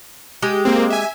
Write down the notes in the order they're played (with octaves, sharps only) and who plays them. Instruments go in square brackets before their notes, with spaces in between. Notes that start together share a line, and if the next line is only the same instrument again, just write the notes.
[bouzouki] G#3 G4
[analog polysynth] A#3 C4
E5 G#5